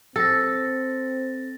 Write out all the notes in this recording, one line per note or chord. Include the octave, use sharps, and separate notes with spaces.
C4 A4 A6 A#6